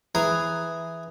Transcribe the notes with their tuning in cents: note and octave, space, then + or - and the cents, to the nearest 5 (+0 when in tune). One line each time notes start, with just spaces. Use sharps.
E3 +0 G#4 +0 A#5 +0